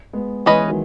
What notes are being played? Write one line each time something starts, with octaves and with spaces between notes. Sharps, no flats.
G#3 B3
E3 G#3 C#4 G#4 B4 D#5
D#3 F#3